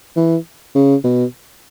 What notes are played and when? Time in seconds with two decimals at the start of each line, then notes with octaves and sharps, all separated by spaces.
0.16 E3
0.75 C#3
1.04 B2